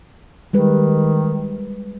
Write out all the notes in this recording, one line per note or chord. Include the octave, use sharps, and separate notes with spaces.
D#3 G3 G#3 B4